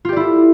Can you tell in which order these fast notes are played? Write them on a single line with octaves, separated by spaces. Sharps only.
F4 G4 D5 E4 A4